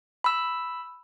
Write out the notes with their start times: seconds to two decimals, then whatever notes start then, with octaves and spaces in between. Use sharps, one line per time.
0.24 B5 E6